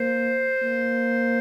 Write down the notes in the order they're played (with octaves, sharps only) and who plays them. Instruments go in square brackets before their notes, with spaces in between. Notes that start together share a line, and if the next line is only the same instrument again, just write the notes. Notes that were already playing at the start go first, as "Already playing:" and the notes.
Already playing: [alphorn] A#3 [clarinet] C5
[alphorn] A#3